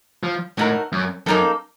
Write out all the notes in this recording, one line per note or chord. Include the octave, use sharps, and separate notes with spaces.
F3
A2 A3 D#4 F#4 A#4
F#2
F#2 A#3 D#4 A4